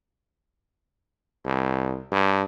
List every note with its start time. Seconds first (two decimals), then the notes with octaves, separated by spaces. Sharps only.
1.45 C2
2.12 G2